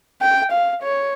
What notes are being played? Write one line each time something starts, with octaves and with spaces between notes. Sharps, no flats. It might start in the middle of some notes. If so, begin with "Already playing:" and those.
G5
F5
C#5